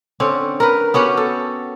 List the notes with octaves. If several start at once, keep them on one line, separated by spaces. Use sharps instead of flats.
D3 C4 C#4
A#4 B4
B3 C#4 F#4 G4
A4